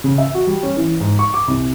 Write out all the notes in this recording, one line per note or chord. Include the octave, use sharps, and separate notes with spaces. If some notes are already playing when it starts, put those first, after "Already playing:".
C#3
E5
F#4
G3
C#4
E3
G#2
C#6
D6
C2